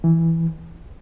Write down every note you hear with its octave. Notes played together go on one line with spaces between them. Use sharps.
E3